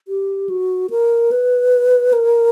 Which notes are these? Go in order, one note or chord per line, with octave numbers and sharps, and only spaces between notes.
G4
F#4
A#4
B4
A#4